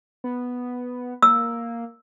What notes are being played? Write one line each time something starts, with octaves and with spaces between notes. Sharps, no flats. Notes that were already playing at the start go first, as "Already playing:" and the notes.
B3
A#3 E6